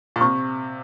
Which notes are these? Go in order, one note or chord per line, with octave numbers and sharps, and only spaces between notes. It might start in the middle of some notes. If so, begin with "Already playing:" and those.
A#2
C3 C#6